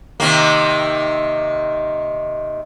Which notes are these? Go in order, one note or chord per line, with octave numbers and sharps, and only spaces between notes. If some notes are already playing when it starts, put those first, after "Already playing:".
C3 D#3 A#3